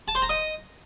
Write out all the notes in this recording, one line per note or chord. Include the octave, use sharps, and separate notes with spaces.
A5
C5
A#5
D#5